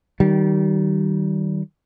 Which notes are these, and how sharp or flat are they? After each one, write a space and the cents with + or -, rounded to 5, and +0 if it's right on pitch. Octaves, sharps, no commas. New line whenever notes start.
D#3 +0 G3 -30